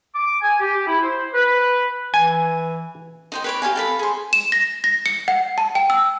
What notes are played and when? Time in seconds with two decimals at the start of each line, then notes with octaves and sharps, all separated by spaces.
0.15 D6
0.42 G#5
0.61 G4
0.86 E4
1.02 C5
1.34 B4
2.14 E3 G#5
3.32 D#4 C5 G5
3.44 B4 C#5 D6
3.62 G4 C#5 F5 G#5
3.76 A4 F5 B5
3.99 G#4 C5
4.33 E7
4.52 A#6
4.84 A#6
5.06 C#7
5.28 F#5
5.58 A5
5.75 G5
5.90 E6